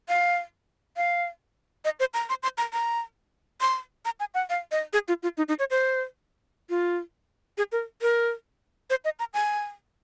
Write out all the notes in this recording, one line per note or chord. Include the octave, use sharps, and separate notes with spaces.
F5
F5
D#5
C5
A#5
C6
C6
A#5
A#5
C6
A#5
G#5
F#5
F5
D#5
G#4
F4
F4
D#4
D#4
C#5
C5
F4
G#4
A#4
A#4
C5
D#5
A#5
G#5